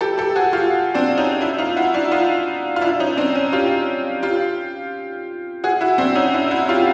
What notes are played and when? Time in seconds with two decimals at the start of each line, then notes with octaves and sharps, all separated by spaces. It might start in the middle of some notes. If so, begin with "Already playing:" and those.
0.01 G4 A4
0.18 G4 A4
0.36 F#4 G#4
0.53 F4 G4
0.95 C4 D4
1.18 C#4 D#4
1.41 D4 E4
1.58 D#4 F4
1.76 E4 F#4
1.94 D4 E4
2.12 D#4 F4
2.76 F4
2.81 D4 E4
3.00 C#4 D#4
3.17 C4 D4
3.35 C#4
3.53 F4 G4
4.23 F4 G4
5.64 F#4 G#4
5.81 E4 F#4
5.98 C4 D4
6.16 C#4 D#4
6.34 D4 E4
6.51 E4 F#4
6.69 F4 G4